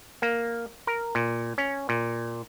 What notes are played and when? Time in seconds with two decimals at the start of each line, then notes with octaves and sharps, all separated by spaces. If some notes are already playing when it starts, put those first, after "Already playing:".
0.22 A#3
0.87 A#4
1.15 A#2
1.58 C#4
1.89 A#2